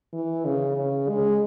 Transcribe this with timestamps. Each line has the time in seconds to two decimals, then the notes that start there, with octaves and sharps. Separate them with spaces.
0.13 E3
0.45 C#3
0.77 C#3
1.09 G#3